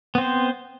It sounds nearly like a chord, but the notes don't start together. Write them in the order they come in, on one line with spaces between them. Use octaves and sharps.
B3 C4 C5